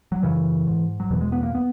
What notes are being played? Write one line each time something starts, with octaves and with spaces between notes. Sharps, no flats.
F#3
F#2 C#3 E3
G#2
F#3
E2 B2 E3
G#3
B3
A#3
B3